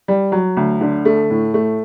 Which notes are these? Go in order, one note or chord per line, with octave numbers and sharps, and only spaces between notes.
G3
F#3
D2
D3
A3
A2
A3